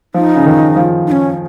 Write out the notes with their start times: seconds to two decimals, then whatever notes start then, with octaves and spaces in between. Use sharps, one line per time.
0.14 F3 D#4
0.36 C#3
0.46 D#3
0.76 F3
1.07 D#4
1.12 C#4